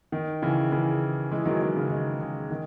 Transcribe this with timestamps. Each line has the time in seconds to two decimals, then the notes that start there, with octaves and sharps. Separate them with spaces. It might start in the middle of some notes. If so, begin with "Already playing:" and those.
0.12 D#3
0.42 C#3 E3
0.72 C#3 E3
1.31 E3 G#3
1.45 D#3 F#3
1.61 D#3
1.76 C#3
1.90 D#3
2.21 C#3
2.51 D#3